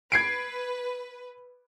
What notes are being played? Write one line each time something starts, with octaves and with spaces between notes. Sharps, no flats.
B4 G#6 C7 D7